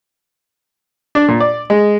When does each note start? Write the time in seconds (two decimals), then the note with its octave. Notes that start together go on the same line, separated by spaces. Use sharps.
1.15 D4
1.28 A#2
1.40 D5
1.70 G#3